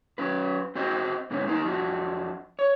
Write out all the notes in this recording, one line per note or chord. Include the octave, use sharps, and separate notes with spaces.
F#3 C#4 B4
C4 F#4 C5 D#5
G#2 D3 B3 C#4
A#3 D#4 A4 A#4
F2 D4 F#4
C#5